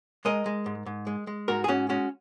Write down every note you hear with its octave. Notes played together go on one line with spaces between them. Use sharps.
G#3 A#4 D#5
G#3
G#2
G#2
G#3
G#3
G#2 F#4 A#4
G#4
G#2 C#4 F#4
G#3 C#4 F#4